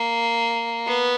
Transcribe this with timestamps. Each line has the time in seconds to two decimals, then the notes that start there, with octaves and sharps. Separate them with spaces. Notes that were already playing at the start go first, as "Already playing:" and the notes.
Already playing: A#3
0.87 B3